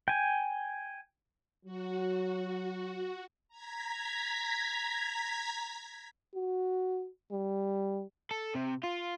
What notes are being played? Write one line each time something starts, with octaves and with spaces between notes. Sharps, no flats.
G5 G#5
F#3 F#4
A#5 G#6 B6
F#4
G3
A4
C3
F4